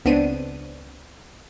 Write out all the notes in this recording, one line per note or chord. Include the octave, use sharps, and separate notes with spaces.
C#2 B3 C4 D4 D#7